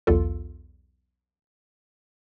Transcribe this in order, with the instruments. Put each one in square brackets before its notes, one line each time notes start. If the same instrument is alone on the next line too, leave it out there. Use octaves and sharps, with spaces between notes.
[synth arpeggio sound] B1 E2 F4 A4